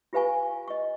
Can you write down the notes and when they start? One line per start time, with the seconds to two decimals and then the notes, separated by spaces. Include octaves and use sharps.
0.13 F4 G4 B4 F5 G#5 C#6
0.68 D#5 C#6